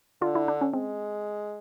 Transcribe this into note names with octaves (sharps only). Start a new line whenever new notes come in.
D3 F4
E4
D4
C#4
G#3 C4